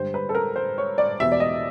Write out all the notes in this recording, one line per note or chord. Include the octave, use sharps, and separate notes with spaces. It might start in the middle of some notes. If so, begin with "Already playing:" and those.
Already playing: G2 D3 G3 C5
B4
A4
A#4
C5
C#5
D5
E2 B2 G3 E5
D5
D#5